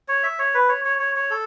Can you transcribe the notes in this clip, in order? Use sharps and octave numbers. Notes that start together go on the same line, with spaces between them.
C#5
E5
C#5
B4
C#5
C#5
C#5
C#5
A4